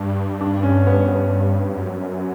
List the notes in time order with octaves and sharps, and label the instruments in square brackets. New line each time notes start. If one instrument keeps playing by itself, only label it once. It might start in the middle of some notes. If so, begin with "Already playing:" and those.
Already playing: [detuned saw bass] G2 [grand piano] D4
[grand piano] D4
C#4
B3
B3
[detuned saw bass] F#2